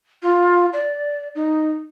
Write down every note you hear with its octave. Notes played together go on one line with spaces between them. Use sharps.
F4
D5
D#4